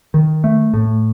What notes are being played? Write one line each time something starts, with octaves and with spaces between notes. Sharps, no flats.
D#3
A3
A2